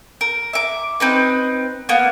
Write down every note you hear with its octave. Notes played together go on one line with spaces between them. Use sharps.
A#4
E5 D6
C4 D#4 B4
A#3 B3